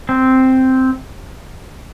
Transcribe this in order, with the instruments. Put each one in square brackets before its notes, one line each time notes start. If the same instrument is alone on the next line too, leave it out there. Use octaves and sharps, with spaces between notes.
[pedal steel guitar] C4